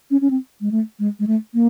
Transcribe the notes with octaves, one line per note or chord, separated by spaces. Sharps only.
C#4
C#4
C4
G#3
A3
G#3
G#3
A3
A#3